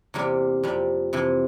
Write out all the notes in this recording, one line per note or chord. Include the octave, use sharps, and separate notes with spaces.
E2 C3 G3 A#3 A#4
F2 C3 G3
F2 C3 E3